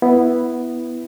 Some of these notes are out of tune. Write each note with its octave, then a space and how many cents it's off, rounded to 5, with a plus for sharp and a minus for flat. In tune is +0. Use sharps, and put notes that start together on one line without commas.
B3 +0 E4 +0